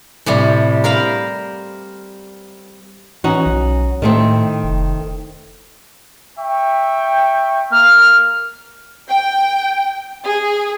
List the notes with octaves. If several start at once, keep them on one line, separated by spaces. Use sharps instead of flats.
A2 C3 G3
A#4 C5 F5 B5
E3 C#4 D#4 F#4
B1
A2 D#3 A3 C4
F1
E5 G5 C#6
A#3 F6
G5
G#4